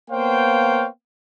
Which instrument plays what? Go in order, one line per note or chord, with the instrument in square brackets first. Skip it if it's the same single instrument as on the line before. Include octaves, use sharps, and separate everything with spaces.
[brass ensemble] A#3 B3 C5 C#5 F5 G5